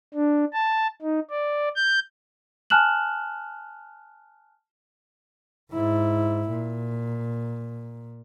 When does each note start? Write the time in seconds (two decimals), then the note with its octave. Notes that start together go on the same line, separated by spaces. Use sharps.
0.14 D4
0.53 A5
1.02 D#4
1.30 D5
1.76 G6
2.70 G#5 A5 F6 F#6 E7 F#7
5.71 G#2 E4
6.49 A#2